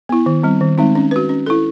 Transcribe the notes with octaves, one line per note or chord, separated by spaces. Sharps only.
B3 E4
D#3
G3 C4
D#3
G#3 C4 D#4
C#4
F#4 B4
C#4
E4 A4